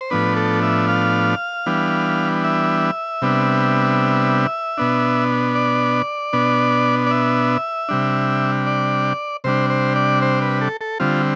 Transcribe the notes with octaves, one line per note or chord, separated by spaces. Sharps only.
C5
A2 F3 B3 D4 B4
A4
E5
F5
E3 G3 B3 D4
E5
C3 G3 B3 D4
B2 B3 D4
D5
B2 B3 D4
D5
E5
C3 G3 D4
D5
C3 G3 D4 C5
C5
D5
C5
B4
A4
A4
D3 G3 C4 F4